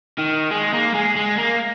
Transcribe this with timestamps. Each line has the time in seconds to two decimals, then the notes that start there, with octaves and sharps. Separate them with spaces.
0.19 D#3
0.51 G#3
0.74 A#3
0.95 G#3
1.17 G#3
1.39 A#3